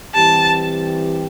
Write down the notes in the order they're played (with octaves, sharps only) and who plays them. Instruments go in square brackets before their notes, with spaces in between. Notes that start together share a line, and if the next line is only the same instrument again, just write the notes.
[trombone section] E3 G3 C4 G4 [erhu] A5